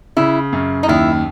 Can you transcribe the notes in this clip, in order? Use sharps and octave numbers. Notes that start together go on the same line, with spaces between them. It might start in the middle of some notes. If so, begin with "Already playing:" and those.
C#3 E4
F#2
D#4
D#2 E4